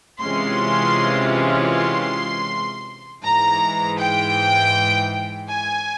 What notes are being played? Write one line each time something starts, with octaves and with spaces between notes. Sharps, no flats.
C3 E3 G#3 C#4 F4 C6
C6
G#2 E3 G#3 A#5
G5
G#5